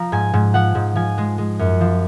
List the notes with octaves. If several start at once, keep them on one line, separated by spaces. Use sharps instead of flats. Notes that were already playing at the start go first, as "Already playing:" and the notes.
Already playing: F3 A#5
G#2 G#5
G#2
F3 F#5
G#2
F3 G#5
G#3
G#3
F#2
F3